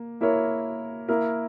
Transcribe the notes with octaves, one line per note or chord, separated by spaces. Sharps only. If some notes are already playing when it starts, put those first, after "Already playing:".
Already playing: A#3
A#3 E4 A#4 C#5
A#3 E4 A#4